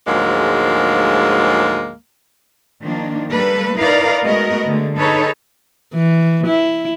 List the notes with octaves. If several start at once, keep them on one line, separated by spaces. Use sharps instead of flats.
D2 G#2 F3 F#3 G#3 A#3
D#3 F3 A#3 D4
G3 A#3 A4 B4
D#4 E4 A#4 B4 D5 F5
G#3 A3 B3 F#4 A#4 D#5
D3 G#3 A3
D#4 G#4 A4 B4 C#5
E3
E4